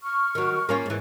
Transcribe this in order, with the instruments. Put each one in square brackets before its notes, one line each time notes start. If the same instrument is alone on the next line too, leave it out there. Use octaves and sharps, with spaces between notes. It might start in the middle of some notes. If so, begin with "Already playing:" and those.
[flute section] C#6 F6
[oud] D#3 F#3
A#3 C#4 F4
G#2 E3